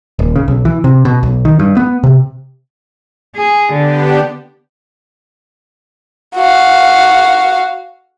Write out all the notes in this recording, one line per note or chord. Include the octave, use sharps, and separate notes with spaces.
D#1
C#3
B1
E3
C3
B2
B1
D#3
G2
B3
C3
G#4
D3 B3 D4 G4
F#4 F5